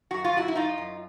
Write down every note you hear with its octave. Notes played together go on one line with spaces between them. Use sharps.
F#2 F#4
F4
F#2 E4 F#4
E4
F#2 D#4 F4
F#2